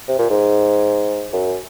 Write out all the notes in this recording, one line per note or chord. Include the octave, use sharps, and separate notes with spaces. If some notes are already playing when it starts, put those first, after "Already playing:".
C3
A#2
G#2
F#2